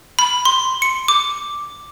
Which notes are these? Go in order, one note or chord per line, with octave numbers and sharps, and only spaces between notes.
B5
C6
C#7
D6